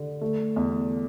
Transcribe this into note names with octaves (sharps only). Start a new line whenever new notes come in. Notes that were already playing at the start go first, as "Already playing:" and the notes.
Already playing: D3
A3
E2